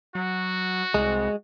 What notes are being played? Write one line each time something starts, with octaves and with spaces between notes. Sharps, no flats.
F#3 F#4
C2 G#3